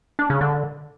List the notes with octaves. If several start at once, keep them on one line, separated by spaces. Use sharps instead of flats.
D4
C#3
D3